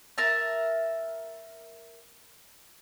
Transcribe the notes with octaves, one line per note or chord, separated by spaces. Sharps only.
A#4 E5 A5